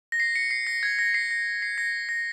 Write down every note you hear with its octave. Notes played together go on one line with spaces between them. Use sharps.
A#6
C7
C#7
C7
A#6
G#6
A#6
C7
A#6
C7
A#6
A#6